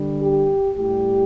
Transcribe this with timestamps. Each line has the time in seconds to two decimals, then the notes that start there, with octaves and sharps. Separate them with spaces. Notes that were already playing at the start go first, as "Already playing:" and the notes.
Already playing: D3 G3
0.21 G4
0.75 A2 G4
0.80 G3